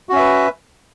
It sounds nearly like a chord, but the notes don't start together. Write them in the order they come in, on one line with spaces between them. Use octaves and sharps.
F#4 C#4 E5 B4